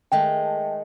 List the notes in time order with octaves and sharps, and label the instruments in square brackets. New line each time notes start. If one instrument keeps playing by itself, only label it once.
[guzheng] D#3 G#3 A3 [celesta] G5